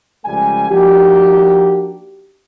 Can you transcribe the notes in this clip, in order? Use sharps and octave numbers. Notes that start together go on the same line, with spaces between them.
C#2 F3 G3 A3 G#5
F3 A#3 D4 D#4 F#4 G4